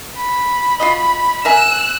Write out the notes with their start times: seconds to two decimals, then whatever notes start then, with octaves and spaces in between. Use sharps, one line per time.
0.16 B5
0.80 F4 F#4 D#5
1.45 A#4 E5 G#5 E6 F#6